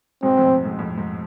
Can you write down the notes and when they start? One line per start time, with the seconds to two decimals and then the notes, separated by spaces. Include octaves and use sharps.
0.22 G#2 B2 C4
0.37 F2 A2
0.65 G#2
0.79 F2 A2
0.98 G#2